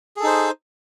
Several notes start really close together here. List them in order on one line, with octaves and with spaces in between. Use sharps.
G#4 A4 D#4 C5